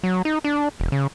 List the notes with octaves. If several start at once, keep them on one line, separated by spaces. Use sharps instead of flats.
F#3
D#4
D4
E1
C#3